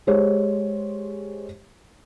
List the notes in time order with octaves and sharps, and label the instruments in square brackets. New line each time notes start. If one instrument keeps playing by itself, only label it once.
[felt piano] G#3 G4 C5 C#5